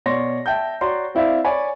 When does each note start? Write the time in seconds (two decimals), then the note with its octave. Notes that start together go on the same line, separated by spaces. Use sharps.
0.06 B2 C#5 D5 C6 A#6
0.46 E5 G5 A5 G6
0.81 F#4 C#5 D5 A#5 C6
1.15 C4 E4 D5 E5 F5
1.44 C#5 D5 G#5 B5